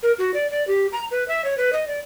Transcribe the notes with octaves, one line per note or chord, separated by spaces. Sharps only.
A#4
F#4
D5
D5
G4
A#5
B4
E5
C#5
B4
D#5
D5